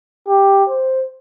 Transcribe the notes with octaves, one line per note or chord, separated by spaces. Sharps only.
G4
C5